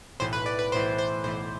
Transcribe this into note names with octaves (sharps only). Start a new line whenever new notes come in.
B1 A2 E3 C5
B4
D5
B4
B1 A2 E3 C5
C5
B1 A2 E3 C5